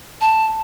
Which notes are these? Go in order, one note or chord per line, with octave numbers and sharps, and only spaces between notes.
A5